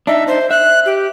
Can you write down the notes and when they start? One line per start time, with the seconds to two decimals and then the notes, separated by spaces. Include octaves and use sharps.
0.07 D4 D#4 E5
0.28 C5
0.51 E5 F#6
0.86 G4